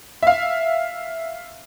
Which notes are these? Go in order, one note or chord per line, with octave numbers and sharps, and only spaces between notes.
E5 F5